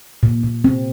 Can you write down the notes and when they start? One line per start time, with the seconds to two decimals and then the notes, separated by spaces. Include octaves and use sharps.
0.23 A#2
0.43 A#2
0.64 C4